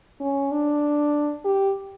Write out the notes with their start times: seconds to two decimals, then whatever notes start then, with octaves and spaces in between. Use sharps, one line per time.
0.20 C#4
0.52 D4
1.44 G4